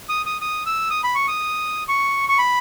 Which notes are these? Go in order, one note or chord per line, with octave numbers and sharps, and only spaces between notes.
D#6
D#6
D#6
E6
D#6
B5
C#6
D#6
C#6
C#6
B5